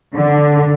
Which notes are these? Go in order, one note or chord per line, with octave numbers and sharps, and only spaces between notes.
D3